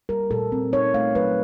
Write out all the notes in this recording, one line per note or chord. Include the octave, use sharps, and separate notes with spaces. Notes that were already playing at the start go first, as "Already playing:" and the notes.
G3 A#4
A#2 A4
C4
D#4 C#5
A3 F5
F#3 B4